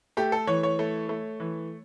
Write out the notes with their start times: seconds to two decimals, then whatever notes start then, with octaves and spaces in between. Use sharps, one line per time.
0.17 A3 G4
0.32 A4
0.47 E3 C#5
0.63 C#5
0.79 A3
1.09 A3
1.40 E3